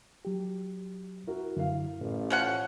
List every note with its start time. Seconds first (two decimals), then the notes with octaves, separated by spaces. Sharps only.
0.25 F#3 G4
1.27 E4 F#4 A#4
1.57 F#2 D3 E4 F5
2.01 A1 A2
2.30 F3 C#4 F#5